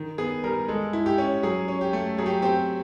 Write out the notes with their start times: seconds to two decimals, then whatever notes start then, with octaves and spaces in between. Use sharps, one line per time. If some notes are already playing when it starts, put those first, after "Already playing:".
Already playing: D#3
0.18 B3 G#4
0.44 G3 A#4
0.68 G#3 A4
0.93 E4
1.06 G4
1.18 C#4
1.43 F#3 G#4
1.68 C#4
1.81 G4
1.93 A3
2.18 F#3 G#4
2.26 G4
2.42 C4 G4